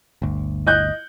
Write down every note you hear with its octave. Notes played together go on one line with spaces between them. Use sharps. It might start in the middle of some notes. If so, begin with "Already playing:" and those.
G1 D2
D#5 F#6 G6